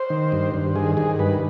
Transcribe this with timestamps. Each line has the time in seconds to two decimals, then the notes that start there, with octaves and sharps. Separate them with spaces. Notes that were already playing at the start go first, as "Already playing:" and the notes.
Already playing: C5
0.10 D#3
0.32 G2
0.54 G2
0.75 D#3 G#4
0.97 D#3 G#4
1.19 G2 B4